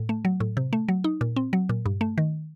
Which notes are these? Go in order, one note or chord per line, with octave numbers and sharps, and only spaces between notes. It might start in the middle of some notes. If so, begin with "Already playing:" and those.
Already playing: A2
A3
F#3
A2
C3
A3
F#3
D#4
A#2
C4
F#3
A#2
G2
A3
D#3